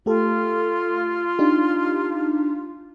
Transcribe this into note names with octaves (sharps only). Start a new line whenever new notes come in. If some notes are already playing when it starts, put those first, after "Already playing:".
A3 F4 G4 A4
D4 D#4 G4